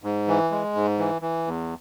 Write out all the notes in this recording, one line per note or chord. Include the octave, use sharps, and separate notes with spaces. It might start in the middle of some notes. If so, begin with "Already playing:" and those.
G#2
E3
G#3
G#2
E3
E3
E2